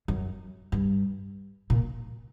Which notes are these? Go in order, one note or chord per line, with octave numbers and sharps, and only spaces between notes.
F#2
G2
A#2